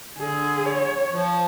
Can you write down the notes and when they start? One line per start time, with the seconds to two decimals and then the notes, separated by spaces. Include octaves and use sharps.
0.17 D3 G#4
0.65 C#5
1.11 F3